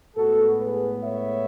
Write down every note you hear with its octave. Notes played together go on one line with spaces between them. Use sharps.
A2 G#3 B3 F#4 A4
G#4 B4
C#5 E5